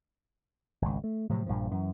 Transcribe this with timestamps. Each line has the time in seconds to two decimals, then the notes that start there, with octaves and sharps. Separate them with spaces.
0.82 G#1 C#2
1.04 A3
1.29 A2 C3 F3 F#3
1.46 A#1 G2 A#2 F3
1.71 F#2 E3